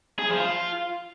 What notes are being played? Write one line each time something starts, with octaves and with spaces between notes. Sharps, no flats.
G#4
F3
F4